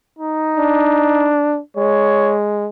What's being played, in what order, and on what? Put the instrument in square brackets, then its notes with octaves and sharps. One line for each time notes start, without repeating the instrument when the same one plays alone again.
[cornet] D#4
[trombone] D4
[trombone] G#3 [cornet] C#5